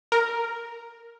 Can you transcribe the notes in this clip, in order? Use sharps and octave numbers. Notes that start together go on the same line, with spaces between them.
A#4